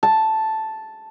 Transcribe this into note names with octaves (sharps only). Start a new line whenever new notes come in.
A5